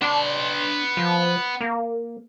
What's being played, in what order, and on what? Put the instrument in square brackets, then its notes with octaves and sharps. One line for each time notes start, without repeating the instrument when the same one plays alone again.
[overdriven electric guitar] B3 C6 [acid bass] D4
[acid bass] F3
A#3